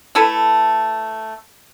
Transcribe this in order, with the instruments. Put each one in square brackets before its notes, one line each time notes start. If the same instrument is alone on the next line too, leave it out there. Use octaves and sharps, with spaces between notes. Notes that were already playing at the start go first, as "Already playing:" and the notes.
[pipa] A3 E4 A4 B4